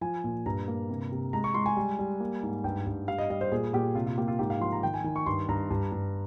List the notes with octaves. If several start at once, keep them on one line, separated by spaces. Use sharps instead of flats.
F3 G#5
A#2
G2 A#5
A#3
C3
C3
G#3 A#5
C#6
G#3 C6
G#5
G3
G3
A#3
G#2
G2 G5
G2
G3 F5
D#5
G3 D#5
C5
A#2 G#4
A#2 G4
C3 F4
F4
A#3 G4
F4
G#2 G4
F5
F3 C6
A#5
D#3 G5
G#5
D#3
C#6
G2 C6
G2 A#5
G2
G2